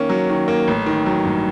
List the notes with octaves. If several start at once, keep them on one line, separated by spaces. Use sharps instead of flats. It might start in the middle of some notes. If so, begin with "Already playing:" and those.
Already playing: D#3 A#3 C#4
F#3
D#3
A#3
A1
D#3
F#3
G2